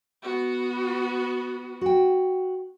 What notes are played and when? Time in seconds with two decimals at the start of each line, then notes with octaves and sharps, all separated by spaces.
0.23 B3 F#4
1.81 F#4 G5